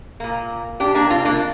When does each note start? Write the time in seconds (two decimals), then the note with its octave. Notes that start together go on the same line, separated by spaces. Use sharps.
0.20 A#2 A#3
0.80 D4 G4
0.95 A#3 D4
1.10 C4 F4
1.25 A#3 D4